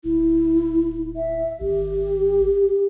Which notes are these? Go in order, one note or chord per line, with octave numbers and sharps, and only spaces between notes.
D1 E4
E5
G#1 G4